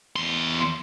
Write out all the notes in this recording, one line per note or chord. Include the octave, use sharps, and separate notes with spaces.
E2 C6